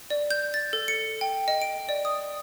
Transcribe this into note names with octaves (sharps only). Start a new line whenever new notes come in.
D5
G6
A6
A4
C#7
G5
D#5
D7
D5
D#6